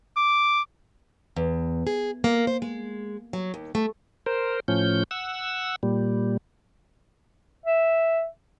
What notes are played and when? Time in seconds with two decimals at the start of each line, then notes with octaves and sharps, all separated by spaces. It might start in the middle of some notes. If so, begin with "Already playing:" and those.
0.17 D6
1.37 E2
1.87 G#4
2.24 A#3
2.47 C5
2.62 G#3
3.33 F#3
3.54 D#2
3.75 A3
4.26 A#4 C5
4.68 A2 F3 C#4 G6
5.11 F#5 E6
5.83 A#2 G3
7.66 E5